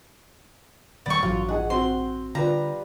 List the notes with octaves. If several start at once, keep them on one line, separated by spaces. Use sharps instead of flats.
D#1 A2 D#3 G3 B3 D5 C#6
A1 G2 E3 F#3 F4
D#4 G#4 D#5 F#5
C4 F#4 C6
D3 G3 F4 B4 A#5